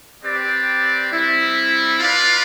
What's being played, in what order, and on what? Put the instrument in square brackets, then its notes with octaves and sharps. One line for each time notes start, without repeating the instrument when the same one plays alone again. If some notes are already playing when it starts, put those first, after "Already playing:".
[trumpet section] C4 G4 B4 D5
G3 C4 E4
F4 B4 D5 F5